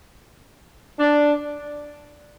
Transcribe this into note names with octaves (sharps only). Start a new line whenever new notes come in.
D4